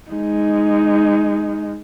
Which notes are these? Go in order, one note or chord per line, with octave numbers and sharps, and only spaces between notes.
G#3 D#4